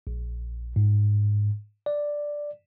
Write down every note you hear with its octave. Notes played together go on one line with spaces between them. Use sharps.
A#1
G#2
D5